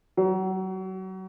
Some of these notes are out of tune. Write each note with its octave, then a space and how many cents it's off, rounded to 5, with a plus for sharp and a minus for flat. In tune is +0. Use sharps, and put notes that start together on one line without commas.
F#3 +30